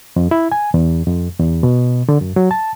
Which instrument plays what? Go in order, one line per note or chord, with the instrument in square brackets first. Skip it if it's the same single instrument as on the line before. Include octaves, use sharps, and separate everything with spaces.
[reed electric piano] F2
E4
G#5
E2
F2
E2
B2
D3
F#2
F#3
A5